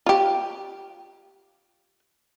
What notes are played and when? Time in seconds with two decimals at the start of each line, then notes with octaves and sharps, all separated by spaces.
0.06 F4 G4